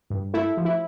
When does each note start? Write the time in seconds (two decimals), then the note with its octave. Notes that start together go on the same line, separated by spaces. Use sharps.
0.10 G2
0.34 A3 E4
0.57 F3
0.65 E4